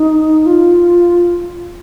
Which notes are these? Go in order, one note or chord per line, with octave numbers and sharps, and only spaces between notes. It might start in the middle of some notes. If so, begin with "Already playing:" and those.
Already playing: D#4
F4